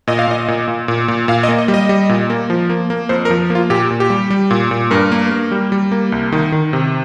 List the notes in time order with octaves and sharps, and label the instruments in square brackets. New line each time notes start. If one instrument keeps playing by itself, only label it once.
[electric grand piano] A#2 D#5
F5
A#2 D#5
A#2
A#2
A#2
A#2
A#2 F5
D#5
A#3
D#5
G3
D#5
G3
A#2
A#3
F3
A#3
A#3
F2 C5
A#4
F3
A#3
F4
A#2 G4
A#2
G4
G3
G3
A#2
A#2
G2 A#4
A#3
A#3
G3
G3
A#3
C2
D#3
D#3
C3